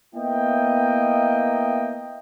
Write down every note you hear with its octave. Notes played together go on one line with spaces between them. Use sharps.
A#3 B3 E4 D#5 G5